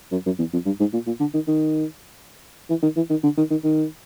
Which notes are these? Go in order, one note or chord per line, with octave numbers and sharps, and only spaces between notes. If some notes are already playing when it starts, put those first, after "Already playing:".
F#2
F#2
E2
F2
G2
G#2
A#2
A#2
D3
D#3
D#3
E3
D#3
E3
D#3
D3
D#3
D#3
D#3